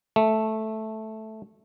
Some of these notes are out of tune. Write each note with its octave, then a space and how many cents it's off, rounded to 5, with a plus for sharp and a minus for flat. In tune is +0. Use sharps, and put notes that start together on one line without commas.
A3 -5